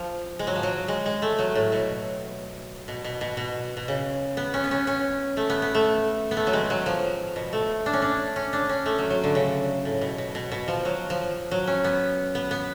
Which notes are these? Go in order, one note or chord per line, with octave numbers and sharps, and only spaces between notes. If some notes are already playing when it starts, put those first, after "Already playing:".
Already playing: F3
G#3
F#3
F3
F#3
G#3
G#3
A3
F#3
A2
B2
B2
B2
B2
B2
B2
C#3
B3
C#4
B3
C#4
C#4
A3
B3
B3
A3
B3
A3
F#3
G#3
F#3
F3
B2
A3
D4
C#4
D4
C#4
D4
C#4
A3
F#3
F#3
D3
C#3
A2
B2
B2
B2
B2
F3
F#3
F3
F#3
C#4
B3
B3
B3